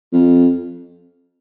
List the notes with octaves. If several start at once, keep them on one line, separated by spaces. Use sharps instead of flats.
F2